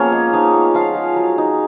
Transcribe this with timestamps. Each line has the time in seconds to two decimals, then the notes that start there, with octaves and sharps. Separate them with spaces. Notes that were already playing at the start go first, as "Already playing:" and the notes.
Already playing: F3 A#3 B3 C#4 G#4 A#4 C#5
0.12 G#3
0.33 F3 D#4 D#5
0.54 B3
0.74 F3 F4 F5
0.95 G#3
1.16 F#3
1.38 D#4